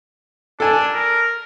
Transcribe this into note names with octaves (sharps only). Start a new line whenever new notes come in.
D4 A4 G#5
A#4